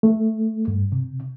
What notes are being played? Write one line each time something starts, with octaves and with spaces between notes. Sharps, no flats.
A3
G2
C3